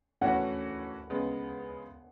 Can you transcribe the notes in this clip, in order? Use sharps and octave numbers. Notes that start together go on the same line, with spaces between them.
E3 A3 C#4 F#4 F#5
C#3 G#3 B3